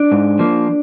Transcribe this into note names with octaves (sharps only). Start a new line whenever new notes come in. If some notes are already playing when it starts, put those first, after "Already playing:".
Already playing: D4
G#2
F3 A#3